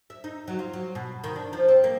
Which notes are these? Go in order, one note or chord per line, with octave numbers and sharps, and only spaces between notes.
E5
D#4
F#3
F4
F#3
B2
D#3
D4
F3
C4
A#3